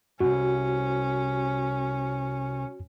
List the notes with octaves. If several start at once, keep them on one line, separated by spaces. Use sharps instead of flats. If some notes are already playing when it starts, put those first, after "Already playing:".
C2 F#2 C#4 F#4